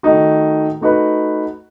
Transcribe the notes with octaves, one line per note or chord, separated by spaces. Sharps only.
D#3 A3 D#4 F#4
A3 D#4 F#4 B4